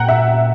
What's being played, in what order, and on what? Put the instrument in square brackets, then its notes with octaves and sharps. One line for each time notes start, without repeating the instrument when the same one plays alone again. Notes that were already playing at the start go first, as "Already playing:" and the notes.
Already playing: [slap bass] A#2 A#3 C#4 [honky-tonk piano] F#5 G5 A#5
[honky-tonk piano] E5